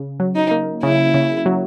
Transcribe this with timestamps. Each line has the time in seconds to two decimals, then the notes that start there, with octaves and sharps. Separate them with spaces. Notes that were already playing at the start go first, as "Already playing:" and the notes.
Already playing: C#3
0.20 F#3
0.35 D#4
0.51 A#3
0.83 C#3 E4
1.14 C#3
1.46 F#3